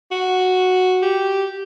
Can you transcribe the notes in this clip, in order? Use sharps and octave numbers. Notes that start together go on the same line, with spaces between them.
F#4
G4